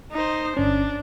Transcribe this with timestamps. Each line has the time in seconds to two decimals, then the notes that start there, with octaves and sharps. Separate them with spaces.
0.12 D#4 C5
0.57 G1 C#4 D4